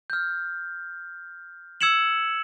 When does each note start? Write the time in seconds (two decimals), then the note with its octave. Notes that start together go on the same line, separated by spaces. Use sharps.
0.10 F6 G6
1.81 E6 G#6 C#7 E7 F#7